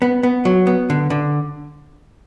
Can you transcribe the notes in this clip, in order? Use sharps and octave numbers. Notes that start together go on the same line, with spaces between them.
B3
B3
F#3
B3
D3
D3